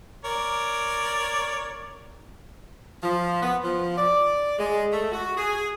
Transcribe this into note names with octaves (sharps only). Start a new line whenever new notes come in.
A#4 C#5 D5
F3
B3
F3
D5
G#3
A3
F#4
G#4